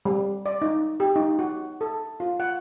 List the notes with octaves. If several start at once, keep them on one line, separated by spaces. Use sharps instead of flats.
G3
D5
D#4
G4
D#4
F#4
A4
F4
F#5